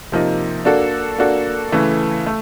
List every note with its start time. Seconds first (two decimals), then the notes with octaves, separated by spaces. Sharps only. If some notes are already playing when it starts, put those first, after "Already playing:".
0.12 C3 F3 A#3 D#4
0.65 A#3 D4 F#4 A4
1.18 A#3 D4 F#4 A4
1.72 C#3 E3 A3
2.26 A3